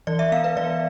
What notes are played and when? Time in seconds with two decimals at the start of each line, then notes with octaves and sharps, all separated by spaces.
0.07 E3 D5
0.19 E5
0.32 B3 F5
0.44 B4
0.57 E3 D5